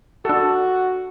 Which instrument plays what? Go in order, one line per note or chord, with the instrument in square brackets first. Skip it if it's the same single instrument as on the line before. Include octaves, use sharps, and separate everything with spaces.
[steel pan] D4 A4 [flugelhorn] F#4